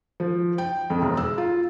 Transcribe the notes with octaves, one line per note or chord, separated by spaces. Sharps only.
F3
G5
F2
E1
E6
F4